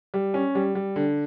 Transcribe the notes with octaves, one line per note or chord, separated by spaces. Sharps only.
G3
C#4
G3
G3
D3